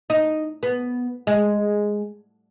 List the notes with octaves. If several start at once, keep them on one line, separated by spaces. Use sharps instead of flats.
D#4
B3
G#3